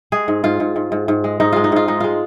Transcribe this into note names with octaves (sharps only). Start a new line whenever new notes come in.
G#3 G#4
G#2
G#2 F4
G#2
G#2
G#2
G#2
G#3
G#2 D#4
G#3 F4
D#4
G#2 F4
G#3 D#4
G#3 F4